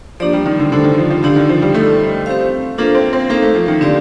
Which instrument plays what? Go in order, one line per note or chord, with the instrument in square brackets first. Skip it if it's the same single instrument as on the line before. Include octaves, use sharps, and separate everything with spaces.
[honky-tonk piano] F3 [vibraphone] A#3 D4 G4 D5
[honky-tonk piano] G3
D#3
D3
[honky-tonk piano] D3 [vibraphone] A3 D4 A4 C5
[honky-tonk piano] D#3
F3
F3
[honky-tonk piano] D3 [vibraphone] D4 G4 D5 F5
[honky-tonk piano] D#3
F3
G3
[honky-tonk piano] A3 [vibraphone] D#4 A4 D#5
[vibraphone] C4 G4 C5 F5
[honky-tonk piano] A#3 [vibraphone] D4 F4 A4 C5 F5
[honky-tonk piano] C4
C4
[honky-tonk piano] A#3 [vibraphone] D#4 A4 C5 F5
[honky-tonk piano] A3
F3
D#3
[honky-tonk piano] D3 [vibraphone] C4 G4 D5 F5